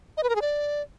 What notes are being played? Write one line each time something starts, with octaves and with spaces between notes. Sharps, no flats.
D#5
B4
A#4
G#4
D5